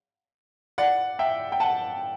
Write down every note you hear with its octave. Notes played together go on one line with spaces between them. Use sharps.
D5 F#5
E5 G5
G5
F#5 A5